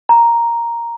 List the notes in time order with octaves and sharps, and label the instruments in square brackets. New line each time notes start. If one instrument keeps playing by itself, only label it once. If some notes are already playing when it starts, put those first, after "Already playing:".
[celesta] A#5